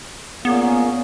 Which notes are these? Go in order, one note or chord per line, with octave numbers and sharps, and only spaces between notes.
A#2 A#3 B3 C#4 G#4